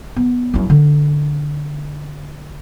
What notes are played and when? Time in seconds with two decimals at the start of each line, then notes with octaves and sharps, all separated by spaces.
0.16 B3
0.54 F#2 E4
0.70 D3